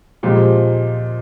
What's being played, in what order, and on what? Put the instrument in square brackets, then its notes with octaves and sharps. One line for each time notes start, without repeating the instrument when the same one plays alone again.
[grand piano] A#2 F3 G#3 C4 G4